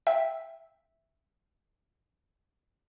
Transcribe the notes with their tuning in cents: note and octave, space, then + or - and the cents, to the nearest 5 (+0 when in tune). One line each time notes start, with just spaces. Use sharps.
E5 +0 G5 +5